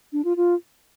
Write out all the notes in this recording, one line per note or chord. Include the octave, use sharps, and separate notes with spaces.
D4
F4
F4